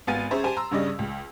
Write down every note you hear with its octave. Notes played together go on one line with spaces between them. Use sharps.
G#1 B3 F5 G#5 A6 D#7
C#4 G#4 C5 E5 A#5
G4 C5 G#5 A5
A#5 C6 E6
G2 C#3 G3 C#4 D5 D#5
C#2